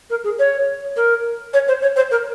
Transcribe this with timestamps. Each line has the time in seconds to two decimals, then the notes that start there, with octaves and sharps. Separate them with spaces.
0.10 A#4
0.24 G#4
0.39 C#5
0.97 A#4
1.54 C#5
1.68 C5
1.82 C#5
1.96 C5
2.11 A#4